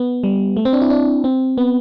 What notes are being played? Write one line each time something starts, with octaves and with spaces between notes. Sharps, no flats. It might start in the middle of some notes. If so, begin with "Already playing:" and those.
Already playing: B3
G3
A3
C4
D4
E4
D4
C4
B3